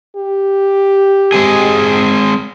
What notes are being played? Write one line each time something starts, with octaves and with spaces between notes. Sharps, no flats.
G4
G#3 C4 G#4